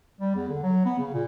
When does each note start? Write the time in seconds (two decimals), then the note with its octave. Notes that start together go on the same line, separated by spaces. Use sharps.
0.21 G3
0.36 E2
0.49 D3
0.63 F#3
0.85 B3
0.99 C#3
1.14 A#2